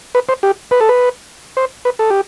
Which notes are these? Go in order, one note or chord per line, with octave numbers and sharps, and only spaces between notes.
B4
C5
G4
B4
A4
B4
C5
B4
A4
G4